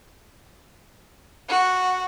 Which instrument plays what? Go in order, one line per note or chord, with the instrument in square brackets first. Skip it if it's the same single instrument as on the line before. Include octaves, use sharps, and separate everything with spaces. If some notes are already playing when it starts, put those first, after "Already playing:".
[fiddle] F#4